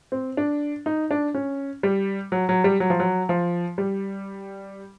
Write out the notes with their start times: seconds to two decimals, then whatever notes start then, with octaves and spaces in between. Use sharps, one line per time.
0.12 C4
0.37 D4
0.86 D#4
1.11 D4
1.35 C#4
1.83 G3
2.32 F#3
2.49 F#3
2.64 G3
2.80 F#3
2.90 F3
3.00 F#3
3.29 F3
3.78 G3